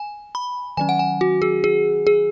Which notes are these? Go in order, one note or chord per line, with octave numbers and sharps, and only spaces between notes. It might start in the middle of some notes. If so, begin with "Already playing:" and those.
Already playing: G#5
B5
D#3 F#3 C#4 G#5
F#5
G#5
F#4
G#4
G#4
G#4